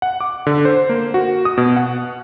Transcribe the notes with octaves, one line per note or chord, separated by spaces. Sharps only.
F#5
D6
D3
C5
A#3
F#4
D#6
B2
F#5